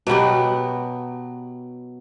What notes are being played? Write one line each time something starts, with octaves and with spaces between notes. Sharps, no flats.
B2 F#3 B3 G4